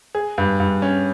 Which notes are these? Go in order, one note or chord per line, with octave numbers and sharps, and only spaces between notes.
G#4
G2
G2
C#4